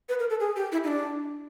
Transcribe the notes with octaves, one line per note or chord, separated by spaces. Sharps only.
B4
A#4
A4
G#4
G4
E4
D#4
D4